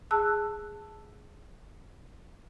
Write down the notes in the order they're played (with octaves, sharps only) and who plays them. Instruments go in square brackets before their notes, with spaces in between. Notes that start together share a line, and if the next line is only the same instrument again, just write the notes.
[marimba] G#4 A5 E6 F#6